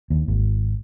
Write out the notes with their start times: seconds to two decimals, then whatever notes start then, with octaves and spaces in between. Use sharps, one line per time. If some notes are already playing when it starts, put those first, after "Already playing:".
0.10 D#2
0.28 G#1